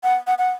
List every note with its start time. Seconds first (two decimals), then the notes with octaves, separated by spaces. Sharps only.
0.03 F#5
0.27 F#5
0.38 F#5